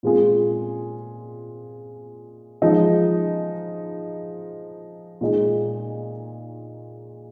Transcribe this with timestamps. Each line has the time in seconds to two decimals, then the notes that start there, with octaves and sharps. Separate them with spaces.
0.03 A#2 G#3 C4 F4 G#4
2.62 F3 G#3 D#4
5.21 A#2 G#3 D#4 G#4